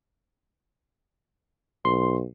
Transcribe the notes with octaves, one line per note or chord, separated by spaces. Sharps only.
B1 C6